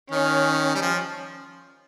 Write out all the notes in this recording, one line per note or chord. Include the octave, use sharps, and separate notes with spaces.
D#3 C#4
G3
F3